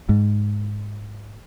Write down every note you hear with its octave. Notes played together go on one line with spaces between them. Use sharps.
G#2